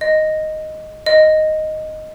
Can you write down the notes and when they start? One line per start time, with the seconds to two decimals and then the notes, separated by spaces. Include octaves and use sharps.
0.01 D#5
1.06 D#5